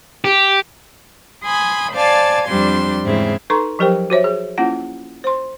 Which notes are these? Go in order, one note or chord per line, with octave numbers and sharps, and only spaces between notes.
G4
G#5 B5 C6 D#6
C5 D5 F5 G#5 A5
F2 G3 D4 C5 C6
E2 G#2 C#3 C4 E4
D#4 A4 B4 A#5 C6 C#6
F3 F#3 G4 A#4 C5 G5
F#4 C5 C#5 E5
G#4
A#3 C#4 E4 F4 F#5
C5 C6